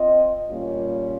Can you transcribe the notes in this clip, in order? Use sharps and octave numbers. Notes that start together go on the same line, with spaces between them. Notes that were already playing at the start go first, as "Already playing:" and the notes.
Already playing: C4 F4 C5 D#5
A#2 G3 A#3 C#4 F4